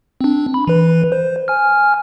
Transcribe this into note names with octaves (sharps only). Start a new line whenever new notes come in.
C4 D4
B5
E3 B4
C5
G#5 F6